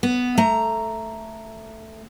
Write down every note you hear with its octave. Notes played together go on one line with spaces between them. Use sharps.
B3
A3 A#5